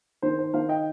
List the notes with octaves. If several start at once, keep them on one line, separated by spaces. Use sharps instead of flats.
D#3 C5
C5
D#3 C5 F5
D#5 G5